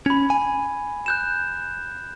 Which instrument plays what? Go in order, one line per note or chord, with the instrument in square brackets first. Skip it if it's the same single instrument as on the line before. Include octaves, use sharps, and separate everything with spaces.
[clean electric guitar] C#4 [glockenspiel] B5 G#6
[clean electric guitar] G#5
[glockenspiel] F#6 G6 E7